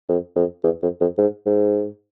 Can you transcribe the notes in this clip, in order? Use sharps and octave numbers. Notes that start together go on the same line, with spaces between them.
F2
F2
E2
F2
F2
G#2
G#2